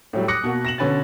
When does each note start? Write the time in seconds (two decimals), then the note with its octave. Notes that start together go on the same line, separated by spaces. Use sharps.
0.13 A2 F#3 G3
0.28 D6 D#6 F#6 A#6 C#7
0.44 B2 A#3 F#4
0.65 A#6 E7 F#7
0.78 B2 D3 C#4 B4 G#5 A6